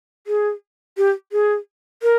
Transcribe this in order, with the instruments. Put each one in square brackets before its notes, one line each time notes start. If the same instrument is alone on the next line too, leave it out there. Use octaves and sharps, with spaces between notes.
[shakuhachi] G#4
G4
G#4
A#4